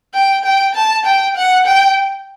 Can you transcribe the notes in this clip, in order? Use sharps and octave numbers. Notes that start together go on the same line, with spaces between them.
G5
G5
A5
G5
F#5
G5